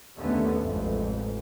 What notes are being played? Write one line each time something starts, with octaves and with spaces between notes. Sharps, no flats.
D#2 D3 A3 B3 C#4
A1 F2 G#2